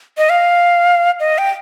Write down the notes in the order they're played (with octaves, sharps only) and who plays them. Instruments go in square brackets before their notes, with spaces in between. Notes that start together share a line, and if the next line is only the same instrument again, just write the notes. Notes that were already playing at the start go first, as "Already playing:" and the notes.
[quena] D#5
F5
D#5
G5